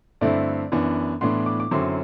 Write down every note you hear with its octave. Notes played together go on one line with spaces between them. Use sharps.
G2 D3 A3 C4 E4 D5
F#2 E3 B3 D4
A2 E3 B3 D4 C6
D6
D6
F#2 D3 F#3 C4 E4 C6